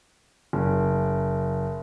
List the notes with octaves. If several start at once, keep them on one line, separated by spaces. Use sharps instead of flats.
F#1